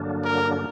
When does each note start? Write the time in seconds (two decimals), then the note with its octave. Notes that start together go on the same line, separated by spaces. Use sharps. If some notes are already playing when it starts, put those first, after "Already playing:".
Already playing: G2 D3 F#3 A#3 D4
0.25 A#4